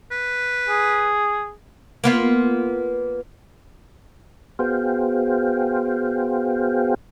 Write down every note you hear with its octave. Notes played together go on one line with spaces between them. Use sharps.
B4
G#4
A#3 B3 F4
B3 F#4 G#4 C5 F5 G5